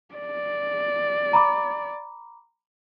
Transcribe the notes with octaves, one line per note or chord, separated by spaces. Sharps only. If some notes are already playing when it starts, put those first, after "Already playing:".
D5
A#5 B5 D6